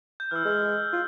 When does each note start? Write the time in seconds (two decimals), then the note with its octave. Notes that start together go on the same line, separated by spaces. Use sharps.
0.20 G6
0.31 E3 E6 F6
0.45 G#3
0.93 F4